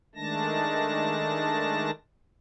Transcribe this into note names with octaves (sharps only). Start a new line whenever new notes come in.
D#3 G#3 A3 D4 A5 A#6